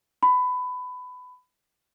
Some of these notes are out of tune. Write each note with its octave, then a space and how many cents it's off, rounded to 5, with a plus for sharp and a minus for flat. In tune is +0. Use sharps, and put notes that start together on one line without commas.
B5 +20